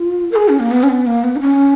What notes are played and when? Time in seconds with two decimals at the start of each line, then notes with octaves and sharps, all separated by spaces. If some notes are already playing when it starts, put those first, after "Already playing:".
Already playing: F4
0.32 A#4
0.36 G#4
0.49 C#4
0.60 A#3
0.71 B3
0.83 C#4
0.89 B3
1.07 A#3
1.24 B3
1.36 D#4
1.41 C#4